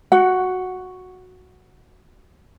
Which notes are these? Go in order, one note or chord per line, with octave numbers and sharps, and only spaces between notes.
F#4 F#5